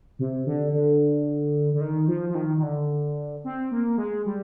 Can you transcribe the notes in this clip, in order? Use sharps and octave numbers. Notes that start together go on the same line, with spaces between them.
C3
D3
D3
D3
D#3
F3
F3
D#3
D#3
D3
C4
A#3
G#3
G3